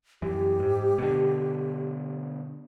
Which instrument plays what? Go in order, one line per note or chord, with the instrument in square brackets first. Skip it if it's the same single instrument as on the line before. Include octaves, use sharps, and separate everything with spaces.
[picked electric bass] F#2 E3 [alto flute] G4
[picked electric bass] G#2
B2 D3